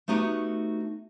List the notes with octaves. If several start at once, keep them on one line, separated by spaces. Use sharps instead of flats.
A3 B3 D#4 F#4 G4